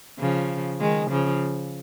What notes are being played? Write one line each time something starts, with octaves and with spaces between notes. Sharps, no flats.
C#3 F3
D#3 G#3
C#3 F3